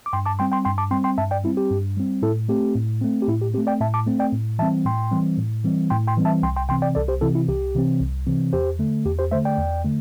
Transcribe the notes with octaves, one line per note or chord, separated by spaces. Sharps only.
D6
G2 G5 C6
A5 D6
G3 C4 G5 C6
G5 C6
G2 G5 C6
A5 D6
G3 C4 G5 C6
G5 C6
G2 E5 A5
D5 G5
G3 C4 E4
G4
G2
G3 C4
A2 E4 A4
A3 C4 G4
A2
A3 C4
G4
A2 E4
G4
A3 C4 G4
D5 G5
A2 E5 A5
A5 D6
A3 C4
D5 G5
A2
E3 G3 C4 E5 A5
A2 G5 C6
E3 G3 C4
A2
E3 G3 C4
A2 G5 C6
G5 C6
E3 G3 C4
E5 A5
C2 G5 C6
G5 C6
C3 E3 C4 G5 C6
D5 G5
C2 A4 D5
G4 C5
C3 E3 C4 E4 A4
E4
C2 G4
C3 E3 C4
C2
C3 E3 C4
E2 G4 C5
D3 A3
E2 G4
G4 C5
D3 A3 C5 E5
D5 G5
E2
D3 A3